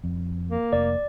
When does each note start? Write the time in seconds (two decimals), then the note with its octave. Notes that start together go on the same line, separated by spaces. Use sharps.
0.04 F2
0.51 A#3
0.73 F1 D5